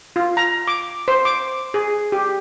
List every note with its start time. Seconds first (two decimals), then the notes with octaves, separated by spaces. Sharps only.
0.16 F4
0.37 A#5
0.68 D6
1.08 C5
1.25 D6
1.74 G#4
2.12 G4